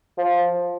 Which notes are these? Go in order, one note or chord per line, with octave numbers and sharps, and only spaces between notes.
F3